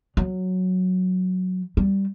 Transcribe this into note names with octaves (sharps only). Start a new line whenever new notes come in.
F#3
G3